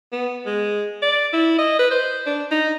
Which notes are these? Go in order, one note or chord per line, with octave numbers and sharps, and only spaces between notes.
B3
G#3
D5
E4
D#5
B4
C5
D4
D#4